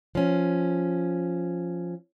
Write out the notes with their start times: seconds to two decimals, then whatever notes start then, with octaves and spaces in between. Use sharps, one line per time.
0.15 F3 C#4